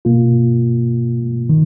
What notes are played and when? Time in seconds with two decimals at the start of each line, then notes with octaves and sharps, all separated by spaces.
0.05 B2 A#3 F4
1.49 D#3